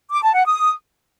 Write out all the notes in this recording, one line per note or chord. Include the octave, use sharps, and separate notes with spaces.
D6
A5
F#5
D#6